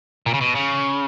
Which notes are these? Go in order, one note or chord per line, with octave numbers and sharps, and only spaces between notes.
A#2
C#3
B2
C#3